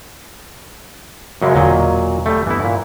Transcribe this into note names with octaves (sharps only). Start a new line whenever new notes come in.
F#2 C#3 G#3
E1 A#2 D3 F#3 D#5
G3 A3
G2 E3 B3 E4
A#2